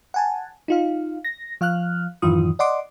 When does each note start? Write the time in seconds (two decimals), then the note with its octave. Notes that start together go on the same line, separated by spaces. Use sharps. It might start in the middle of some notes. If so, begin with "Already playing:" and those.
0.14 F#5 G#5 A5
0.68 D#4 F4 F5
1.25 A#6
1.61 F3 F5 F6 F#6
2.22 F#2 A2 D#3 E3 F4 D#6
2.59 D5 D#5 F#5 C6 D6